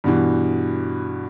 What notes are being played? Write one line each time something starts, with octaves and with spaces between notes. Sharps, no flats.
G2 B2 E3